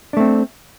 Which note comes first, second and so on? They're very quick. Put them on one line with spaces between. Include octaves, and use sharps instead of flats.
D4 A3 C4